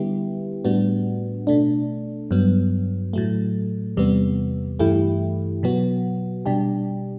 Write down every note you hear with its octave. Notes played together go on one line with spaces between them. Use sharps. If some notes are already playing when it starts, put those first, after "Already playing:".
Already playing: D3 G3 B3 E4 G4
A2 G3 B3 D4 F#4
B2 A3 D4
G2 F#3 B3
A2 F#3 A3
E2 C3 G3 B3
G2 E3 A3 E4 G4
B2 F#3 B3 F#4
B2 G3 D4 G4